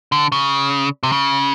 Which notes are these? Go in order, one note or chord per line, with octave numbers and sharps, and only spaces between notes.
D3
C#3
C3
C#3